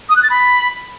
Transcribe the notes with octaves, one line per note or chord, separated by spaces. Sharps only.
D#6
F#6
A6
B5